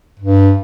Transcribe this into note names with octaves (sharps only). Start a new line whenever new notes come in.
G2